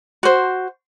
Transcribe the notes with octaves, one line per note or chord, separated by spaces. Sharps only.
F#4 C5